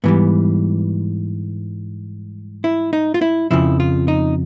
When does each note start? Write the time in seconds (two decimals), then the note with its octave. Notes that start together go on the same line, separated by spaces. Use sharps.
0.04 G#2 E3 G3 B3
2.64 E4
2.93 D#4
3.14 F4
3.22 E4
3.51 F2 C#3 F3 E4
3.80 F4
4.08 D#4